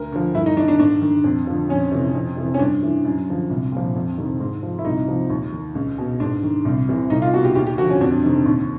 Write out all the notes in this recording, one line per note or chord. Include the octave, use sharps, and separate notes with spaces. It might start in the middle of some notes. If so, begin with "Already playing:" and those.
Already playing: D2 A#4
D3 F3
G2 E4
D#4
D#3 D4
D4
G#2 D4
D#3
F2
D3 F3
F2 C#4
C3 E3
F2
C3 E3
C#4
G2 D4
E3
F#2
D3 F3
C2
A#2 F3
F2
C3 D#3
G#2
F3
E4
C2 D#4
C3 F3
D#2
D#3
C#2
B2
G#2 D4
D#3
C2
C3 E3
C2 D#4
F4
B2 F#4
G4
D#2 G4
G4
D3 F3 F#4
C#4
F2 D4
C3 D#3
D#2